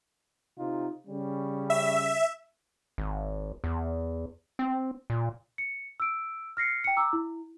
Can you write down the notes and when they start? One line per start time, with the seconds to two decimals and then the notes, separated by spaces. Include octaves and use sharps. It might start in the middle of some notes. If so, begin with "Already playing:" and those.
0.59 C3 D#4 F4
1.07 C#3 G3 C#4
1.70 E5
2.98 G#1
3.64 E2
4.59 C4
5.10 A#2
5.58 C#7
6.00 E6 D7
6.57 F6 A#6 C7 C#7
6.84 G5 C#7
6.96 A#5 D6 E6
7.13 E4